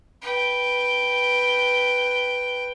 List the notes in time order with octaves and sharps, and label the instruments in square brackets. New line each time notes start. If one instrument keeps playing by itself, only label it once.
[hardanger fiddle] B4 G5